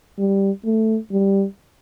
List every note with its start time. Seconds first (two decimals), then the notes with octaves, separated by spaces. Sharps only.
0.18 G3
0.65 A3
1.12 G3